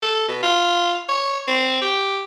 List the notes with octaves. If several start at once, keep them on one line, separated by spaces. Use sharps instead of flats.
A4
B2
F4
C#5
C4
G4